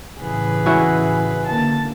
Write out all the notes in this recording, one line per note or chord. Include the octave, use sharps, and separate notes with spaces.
A2 C#3 E3 G#4 B4
C#4 E4 F#4
D3 A#3 A5